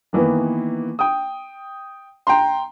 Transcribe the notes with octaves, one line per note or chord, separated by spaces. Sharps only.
D#3 E3 A#3 B3
G5 D#6
G5 A#5 C6